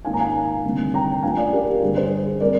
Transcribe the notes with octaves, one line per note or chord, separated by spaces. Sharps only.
G#2 D#3 A#3 D#4 F5 G#5
A#5
F5 G#5
D2 C3 D#3 G3 D4
G5 A#5
D2 D3 F3 F5 G#5
D5 F5
G4 A#4
G4
G2 D3 G3 G#4
G#4 C5
G3 C4 A#4 D5